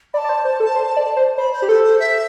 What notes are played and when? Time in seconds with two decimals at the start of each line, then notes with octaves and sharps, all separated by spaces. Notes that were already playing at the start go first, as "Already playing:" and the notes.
0.14 D5 B5
0.17 A5
0.24 D5
0.29 C5
0.45 C5
0.60 A4
0.75 C5
0.96 D5
1.17 C5
1.38 C5 B5
1.53 C5
1.62 G4
1.69 A4 C5
1.84 C5
2.00 E5